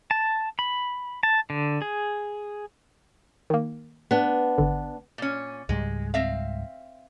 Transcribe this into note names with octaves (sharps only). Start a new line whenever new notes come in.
A5
B5
A5
D3
G#4
D#3 A#3
B3 D4
G#1 D3
A#2 C#4
C#2 G#2 G3 G#3
C4 E5 F5